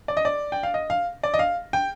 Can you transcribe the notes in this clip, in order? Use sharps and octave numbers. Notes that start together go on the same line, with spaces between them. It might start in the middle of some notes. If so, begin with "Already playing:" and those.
D5
D#5
D5
G5
F5
D#5
F5
D5
D#5
F5
G5